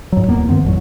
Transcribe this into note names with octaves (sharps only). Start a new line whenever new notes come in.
G#2 F#3
D1 E2 A#3 B3
G2 D#3 B3 C4
A1 E2 F#3